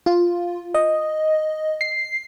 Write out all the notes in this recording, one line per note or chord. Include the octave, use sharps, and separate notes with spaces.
F4
D#5
C7